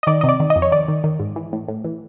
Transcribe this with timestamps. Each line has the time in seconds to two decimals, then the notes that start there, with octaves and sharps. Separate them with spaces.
0.03 D#5
0.07 D#3 D5
0.21 C3 D#5
0.29 D5
0.40 D#3
0.50 D#5
0.56 F2
0.62 C#5
0.71 D#3 D5
0.88 D#3
1.04 D#3
1.20 G#2
1.36 E3
1.53 A2
1.68 A2
1.85 E3